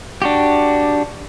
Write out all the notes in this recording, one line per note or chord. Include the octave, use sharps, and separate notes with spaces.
D4 F#4 G4